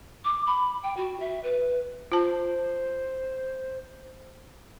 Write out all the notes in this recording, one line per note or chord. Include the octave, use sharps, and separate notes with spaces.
D6
B5
G5
F#4
E5
B4
F4 C5 A5